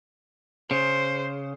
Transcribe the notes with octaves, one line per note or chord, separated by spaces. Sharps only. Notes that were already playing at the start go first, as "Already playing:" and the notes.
C#3 C5